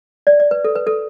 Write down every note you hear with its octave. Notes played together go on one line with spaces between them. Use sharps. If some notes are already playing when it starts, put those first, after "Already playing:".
D5
D5
B4
A4
B4
A4